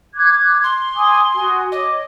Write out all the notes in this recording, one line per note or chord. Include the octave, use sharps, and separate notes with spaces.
D6 F#6 G#6
C6
G#5 D6 D#6
F#4 G#5 D#6
C#5 D#5 D6